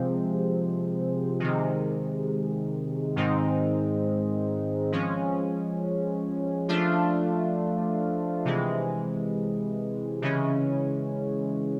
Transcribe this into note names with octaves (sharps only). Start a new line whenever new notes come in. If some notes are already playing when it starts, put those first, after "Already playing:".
Already playing: C3 F3 G#3 C4
C3 D#3 G#3
G#2 D#3 G#3 C4 D#4
F3 G#3 C#4
F3 A3 D4 F4
C3 E3 G#3
C#3 E3 G#3 C#4